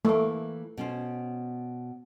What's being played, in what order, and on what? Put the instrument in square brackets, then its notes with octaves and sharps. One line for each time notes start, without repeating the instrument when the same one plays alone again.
[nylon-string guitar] E3 A#3 [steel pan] A3
[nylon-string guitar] B2 C#4 C5